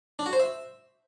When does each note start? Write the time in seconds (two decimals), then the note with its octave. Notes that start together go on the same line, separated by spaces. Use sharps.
0.19 D4
0.26 F#4
0.33 C5
0.40 E5